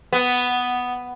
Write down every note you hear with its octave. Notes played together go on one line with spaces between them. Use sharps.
B3